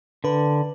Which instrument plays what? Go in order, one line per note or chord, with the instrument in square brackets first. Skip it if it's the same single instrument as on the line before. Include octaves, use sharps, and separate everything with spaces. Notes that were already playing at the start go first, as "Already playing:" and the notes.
[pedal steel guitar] D3 [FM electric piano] B4